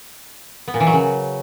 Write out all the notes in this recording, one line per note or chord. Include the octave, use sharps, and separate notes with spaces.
B3
A#2
E3
F#3
C#3